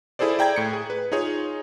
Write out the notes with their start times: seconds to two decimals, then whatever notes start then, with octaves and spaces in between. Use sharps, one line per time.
0.19 E4 G#4 A4 C5 D5
0.39 D5 G5 A#5 G#6
0.56 A2 C#7
0.73 G#4
0.90 B4
1.12 D#4 F4 G#4 C#5